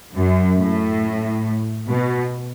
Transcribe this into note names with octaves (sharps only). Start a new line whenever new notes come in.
F#2
A2
B2